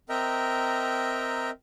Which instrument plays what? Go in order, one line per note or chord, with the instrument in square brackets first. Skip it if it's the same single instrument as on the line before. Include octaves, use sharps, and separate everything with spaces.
[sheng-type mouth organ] C4 A#4 D#5 E5 G5 A#5